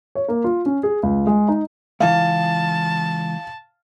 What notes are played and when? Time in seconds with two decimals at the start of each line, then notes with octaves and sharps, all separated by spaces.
0.15 C#5
0.28 A#3
0.44 F4
0.66 C#4
0.83 G#4
1.03 C#2
1.27 G#3
1.48 D#4
2.00 C#2 E3 F5 A5